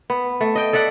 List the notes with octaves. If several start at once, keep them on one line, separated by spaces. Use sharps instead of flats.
B3
A3
D#5 G5
A4 D5 E5 F#5